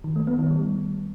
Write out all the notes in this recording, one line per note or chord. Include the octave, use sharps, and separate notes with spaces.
D#3
A3
B3
D#3
G3